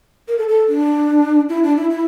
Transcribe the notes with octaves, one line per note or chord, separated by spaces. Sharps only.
A#4
A4
A4
D4
E4
D4
E4
E4